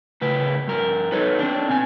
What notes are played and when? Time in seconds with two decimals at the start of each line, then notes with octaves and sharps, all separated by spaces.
0.21 A2 C#3 B4
0.67 G2 A#4
1.12 D#4 A4 B4 C#5
1.39 C4 D4
1.69 B2 G#5